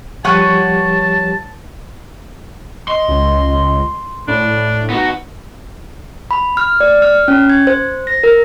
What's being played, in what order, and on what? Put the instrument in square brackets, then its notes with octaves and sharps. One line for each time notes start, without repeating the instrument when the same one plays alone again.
[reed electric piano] F3 G3 G4 [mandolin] B4 C#5 F#5 [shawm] A5
[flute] D#5 [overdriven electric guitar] C6
[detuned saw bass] C#2
[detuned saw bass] A2 [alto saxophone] D4 [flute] B5
[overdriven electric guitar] B3 F#4 [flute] D#4
[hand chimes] B5
F6
D5
F6
C#4
G#6
C5
A#6
A#4